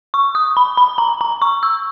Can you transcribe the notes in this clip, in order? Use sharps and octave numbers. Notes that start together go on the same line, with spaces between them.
C#6
D#6
B5
B5
A#5
A#5
C#6
E6